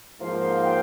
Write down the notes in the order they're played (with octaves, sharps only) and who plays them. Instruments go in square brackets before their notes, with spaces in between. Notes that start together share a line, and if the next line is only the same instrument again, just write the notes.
[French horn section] G#2 F3 A#3 F4 C5 [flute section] F5
[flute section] G5